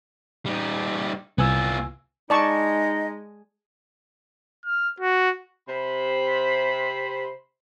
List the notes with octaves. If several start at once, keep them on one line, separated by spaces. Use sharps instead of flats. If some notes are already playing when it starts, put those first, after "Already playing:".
G3 D#4
C2 B3 F4 G#5 E6
G#3 D#4 D5 D#5 A5 C#6
F6
F#4
C3 C5 B5